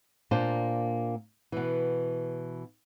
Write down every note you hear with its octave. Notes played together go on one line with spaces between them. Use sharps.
A#2 A#3 D4 C5 A5
B2 E3